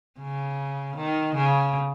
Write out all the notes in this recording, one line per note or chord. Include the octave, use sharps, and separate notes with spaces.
C#3
D#3
C#3